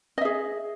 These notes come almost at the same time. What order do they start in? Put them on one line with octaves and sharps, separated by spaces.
D#5 E5 G#4